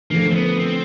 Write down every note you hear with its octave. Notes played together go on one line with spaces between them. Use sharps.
D3 F3 A3 A#3
C4
B3
C4